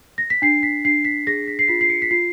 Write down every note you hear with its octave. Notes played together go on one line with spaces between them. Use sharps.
A#6
B6
D4 C7
B6
D4 C7
B6
G#4 A#6
B6
C7
F4 B6
C7
C#7
B6
F4 C7